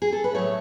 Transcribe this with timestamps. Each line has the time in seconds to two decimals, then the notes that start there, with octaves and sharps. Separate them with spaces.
0.02 G#4
0.12 A4
0.24 B4
0.34 A2 F#3 A3 C#5